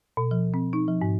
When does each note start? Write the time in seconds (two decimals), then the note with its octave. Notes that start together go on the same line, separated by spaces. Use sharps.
0.17 B2
0.31 F3
0.54 C4
0.73 D#4
0.88 F3
1.02 G#2